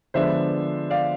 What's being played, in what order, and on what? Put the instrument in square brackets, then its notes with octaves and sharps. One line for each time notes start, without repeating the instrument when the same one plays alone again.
[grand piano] D3 F3 G#3 B3 D4 C5 E5
D5 F5